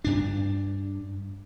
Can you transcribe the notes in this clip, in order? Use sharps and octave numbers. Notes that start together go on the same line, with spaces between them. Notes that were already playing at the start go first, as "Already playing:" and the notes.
G2 D4